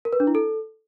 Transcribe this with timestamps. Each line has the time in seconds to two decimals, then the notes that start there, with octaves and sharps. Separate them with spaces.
0.05 A#4
0.13 B4
0.20 D4
0.27 E4
0.35 A4